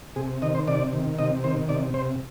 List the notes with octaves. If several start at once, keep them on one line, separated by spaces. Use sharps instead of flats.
C3 G#4
D#3 D#5
C5
C3 D5
D#3
C3 D#5
D#3 C5
C3 D5
C3 C5